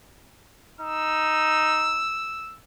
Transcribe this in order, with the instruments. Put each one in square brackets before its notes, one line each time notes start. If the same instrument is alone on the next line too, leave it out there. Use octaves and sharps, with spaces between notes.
[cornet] D#4 [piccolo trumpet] E6